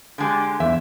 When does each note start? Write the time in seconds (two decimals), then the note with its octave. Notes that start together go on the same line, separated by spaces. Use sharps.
0.18 D3 G#3 G4
0.60 E2 E5